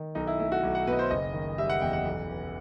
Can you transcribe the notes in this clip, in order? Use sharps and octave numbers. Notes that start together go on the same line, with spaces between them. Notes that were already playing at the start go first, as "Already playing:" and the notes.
Already playing: D#3
B1 D#4
E4
A3 E4
F#4
B1
F#5
B2 B4
D#5
C5
F#1 D#5
D#3
G3 E5
F#5
E2 G5
F#5
B1
E3